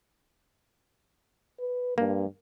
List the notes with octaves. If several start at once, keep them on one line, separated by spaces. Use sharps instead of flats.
B4
G2 A#3